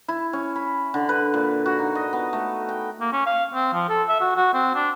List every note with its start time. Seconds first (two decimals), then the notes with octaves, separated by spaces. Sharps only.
0.08 E4
0.33 C#4
0.56 B5
0.94 D3
1.09 B4
1.34 A#2
1.66 F#4
1.79 D#4
1.95 D#5
2.13 B3
2.33 A3
2.69 G5
3.00 A#3
3.12 C#4
3.26 F5
3.54 C4
3.73 F3
3.89 A4
4.09 E5
4.20 F#4
4.36 F#4
4.53 C4
4.75 D4